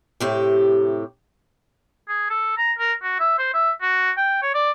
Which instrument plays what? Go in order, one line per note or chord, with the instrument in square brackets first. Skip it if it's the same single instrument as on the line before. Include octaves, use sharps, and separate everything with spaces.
[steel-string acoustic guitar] A2 C3 G4
[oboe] G#4
A4
A#5
A#4
F#4
E5
C5
E5
F#4
G5
C#5
D5